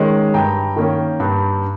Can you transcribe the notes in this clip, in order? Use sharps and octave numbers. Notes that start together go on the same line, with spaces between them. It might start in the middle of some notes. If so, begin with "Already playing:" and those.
Already playing: D#3 G#3 C#4
G2 G5 A#5
D#3 A#3 C#4
G2